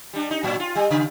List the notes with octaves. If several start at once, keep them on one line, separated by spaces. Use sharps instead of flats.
G3 D4
D#4
A2 F#3
F4
G3
C#3